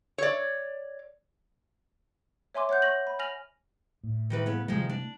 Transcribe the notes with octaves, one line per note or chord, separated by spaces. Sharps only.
C#5 D5
C#5 E5 G#5 C6 D6
C#5 F#5 F#6 G6
C#6 A#6 F#7
B5
G#5 F6 A#6 F7 F#7
A2
D#3 E3 B4
C#3 B3
C3 D#3 F3 G#3 A3
D4